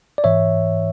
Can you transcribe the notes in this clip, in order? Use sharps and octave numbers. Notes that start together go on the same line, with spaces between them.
D5
G#2 E3 C#5 E5